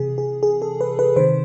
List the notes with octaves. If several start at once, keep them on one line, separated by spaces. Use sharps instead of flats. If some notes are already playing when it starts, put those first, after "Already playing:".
Already playing: C3 E3 G#4
G#4
G#4
A4
B4
B4
C3 D#3 C5